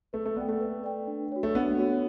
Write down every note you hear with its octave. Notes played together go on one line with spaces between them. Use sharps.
A3 B4
A3
B3 D5 G5
A3
B4
D5 G5
D4
F#4 C#5
A3
B3 D4
F#4 C#5